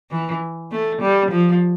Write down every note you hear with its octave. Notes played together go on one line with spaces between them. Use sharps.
E3
A3
G3
F3